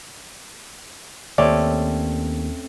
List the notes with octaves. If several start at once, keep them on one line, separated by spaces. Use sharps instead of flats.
D#2 A3 C4 C#4 D5